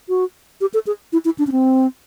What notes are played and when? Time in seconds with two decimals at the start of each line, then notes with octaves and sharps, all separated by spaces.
0.09 F#4
0.61 G4
0.74 A4
0.87 G#4
1.13 E4
1.25 E4
1.39 D4
1.47 C#4
1.52 C4